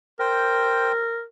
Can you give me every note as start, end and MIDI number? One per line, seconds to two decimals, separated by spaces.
0.20 1.24 70
0.20 0.92 72
0.20 0.92 79